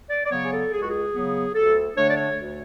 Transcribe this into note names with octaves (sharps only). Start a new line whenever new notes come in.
D5
D5
C#3 F#3 B3 C#5
G#4
A4
C#2 G#4
F#4
G#4
C#3 F#3 B3
D2 A4
D3 A3 D4 C#5
D5
C#5
D2